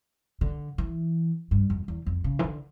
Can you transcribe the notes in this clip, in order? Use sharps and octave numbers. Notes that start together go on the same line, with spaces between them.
D3
E3
G2
F2
E2
F2
C#3
E3
D3